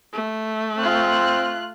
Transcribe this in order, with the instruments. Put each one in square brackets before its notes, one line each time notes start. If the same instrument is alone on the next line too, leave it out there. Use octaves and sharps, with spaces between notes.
[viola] A3
[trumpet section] C4 [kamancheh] F4 F#6